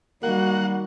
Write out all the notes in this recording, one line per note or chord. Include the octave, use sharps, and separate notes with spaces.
D#3 G3 A#3 F#4 F#5